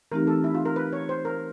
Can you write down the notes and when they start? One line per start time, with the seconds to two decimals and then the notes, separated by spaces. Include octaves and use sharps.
0.12 E3 A3 C4 D#4 G4 A#4
0.27 A4
0.44 E4
0.55 F4
0.65 A#4
0.76 B4
0.93 C#5
1.09 C5
1.25 A#4